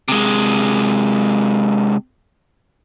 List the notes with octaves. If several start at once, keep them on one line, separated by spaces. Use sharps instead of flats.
C3 G#3